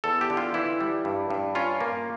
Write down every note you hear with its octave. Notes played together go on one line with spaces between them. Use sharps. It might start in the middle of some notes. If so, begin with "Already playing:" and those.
E2 A4
G4
D3
F4
E3 E4
G3
G2
G2
C#4 F4
A#3